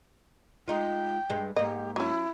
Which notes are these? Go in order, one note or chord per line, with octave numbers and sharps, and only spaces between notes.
G#3 D#4 F4 G5
G2 G#3
G#2 A#3 G4 D#5
F#3 C#4 E4